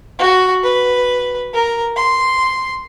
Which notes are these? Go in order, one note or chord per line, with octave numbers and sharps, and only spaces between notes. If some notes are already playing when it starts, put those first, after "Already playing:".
F#4
B4
A#4
C6